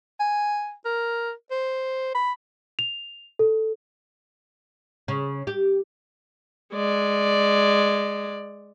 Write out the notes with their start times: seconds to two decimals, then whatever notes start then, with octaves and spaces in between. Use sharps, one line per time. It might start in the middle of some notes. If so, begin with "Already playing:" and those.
0.20 G#5
0.85 A#4
1.51 C5
2.15 B5
2.79 F7
3.39 A4
5.08 C#3
5.47 G4
6.74 G#3 D5